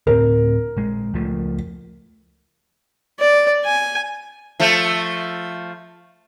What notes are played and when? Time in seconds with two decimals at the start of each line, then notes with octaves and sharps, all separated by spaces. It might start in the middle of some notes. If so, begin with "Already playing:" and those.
0.07 D2 A2 C4 A#4
0.77 A#1 G#3
1.14 C#2 F3 A3
3.19 D5
3.65 G#5
4.60 F3 A3